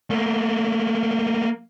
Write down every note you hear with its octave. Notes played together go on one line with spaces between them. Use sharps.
A3 A#3